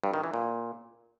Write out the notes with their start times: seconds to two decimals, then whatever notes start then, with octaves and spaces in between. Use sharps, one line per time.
0.04 G2
0.14 D#3
0.24 E3
0.34 A#2